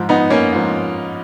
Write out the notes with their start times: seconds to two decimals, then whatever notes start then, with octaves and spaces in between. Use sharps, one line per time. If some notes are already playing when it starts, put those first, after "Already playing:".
Already playing: G#2 F3
0.09 B3 D#4
0.30 A#3 C#4
0.53 G#2 F3